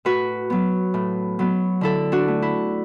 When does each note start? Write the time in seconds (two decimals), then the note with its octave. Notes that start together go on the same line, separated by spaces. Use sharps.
0.05 A2 F#4 B4
0.50 F#3 B3
0.94 A2
1.39 F#3 B3
1.81 D3 E4 A4
2.12 D4 F#4
2.28 A3
2.42 E4